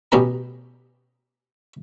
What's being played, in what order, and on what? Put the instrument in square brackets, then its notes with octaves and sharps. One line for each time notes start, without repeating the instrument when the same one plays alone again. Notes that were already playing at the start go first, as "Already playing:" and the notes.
[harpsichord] A1 B2 C#4 G4 B4 A#5